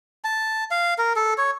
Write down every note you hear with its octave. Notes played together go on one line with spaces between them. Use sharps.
A5
F5
A#4
A4
C#5